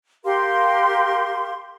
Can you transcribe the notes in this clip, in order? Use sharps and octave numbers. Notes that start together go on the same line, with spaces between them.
G4 A#4 F5 C6